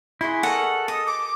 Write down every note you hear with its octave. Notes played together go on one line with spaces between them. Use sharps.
E4 F#4 G#4 C6
A4 A#4 C#5 D#5 F#5
D#5 D#6
D6